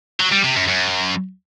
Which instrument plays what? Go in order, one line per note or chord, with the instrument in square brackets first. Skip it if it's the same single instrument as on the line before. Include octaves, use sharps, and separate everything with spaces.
[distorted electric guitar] F#3
G3
C3
F#2
F#2